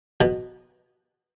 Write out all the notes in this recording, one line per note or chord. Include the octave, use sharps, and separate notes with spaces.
B2